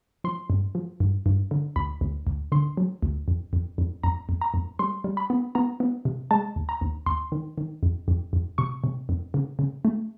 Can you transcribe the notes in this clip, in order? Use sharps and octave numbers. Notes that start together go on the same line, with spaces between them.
F3 C6
G2
F3
G2
G2
D3
D2 B5
D2
D2
D3 C6
F#3
D2
F2
F2
F2
F2 A#5
F2
A#5
F2
G3 C6
G3
B5
B3
B3 A#5
B3
C3
G#3 A5
D#2
A#5
D#2
D#2 C6
D#3
D#3
F2
F2
F2
C3 C#6
C3
F2
C#3
C#3
A3